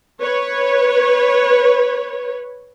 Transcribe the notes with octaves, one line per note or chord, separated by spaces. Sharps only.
B4 C#5